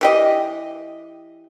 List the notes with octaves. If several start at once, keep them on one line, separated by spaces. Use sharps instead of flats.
E3 G4 D#5